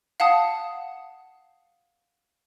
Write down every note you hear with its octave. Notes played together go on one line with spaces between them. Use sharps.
F5 F#5 A5 D#6